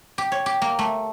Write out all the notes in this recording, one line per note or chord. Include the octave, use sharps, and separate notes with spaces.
G4
C#5
G4
A#3
A3